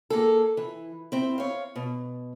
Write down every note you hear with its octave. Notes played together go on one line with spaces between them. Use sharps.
A#3 G#4 A4
E3
C4 E4
C#5 F5
B2